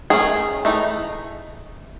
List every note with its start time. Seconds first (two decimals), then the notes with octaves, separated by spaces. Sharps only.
0.10 D#3 A3 C#4 G#4
0.65 E3 A3 D#4